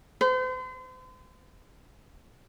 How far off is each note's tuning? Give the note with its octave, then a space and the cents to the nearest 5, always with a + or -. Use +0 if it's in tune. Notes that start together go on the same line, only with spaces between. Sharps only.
C5 -40